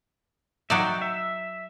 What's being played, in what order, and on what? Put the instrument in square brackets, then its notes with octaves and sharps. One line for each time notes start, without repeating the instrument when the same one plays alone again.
[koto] F#3 D#4 D5 [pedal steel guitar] E5 F#5 G5
[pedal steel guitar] E5